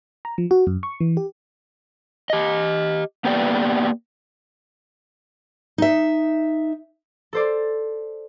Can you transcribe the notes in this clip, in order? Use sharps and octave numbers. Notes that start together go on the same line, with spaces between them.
A#5
F3
F#4
F#2
C#6
E3
G4
G4 D#5
A#3 B3 G4 B4 D5
D#4 E5
A4 C5 D5